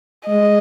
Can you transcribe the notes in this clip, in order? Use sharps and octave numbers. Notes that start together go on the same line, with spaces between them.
G#3 D#5